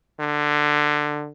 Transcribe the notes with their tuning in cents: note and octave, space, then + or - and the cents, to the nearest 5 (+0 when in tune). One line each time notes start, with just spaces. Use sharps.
D3 +15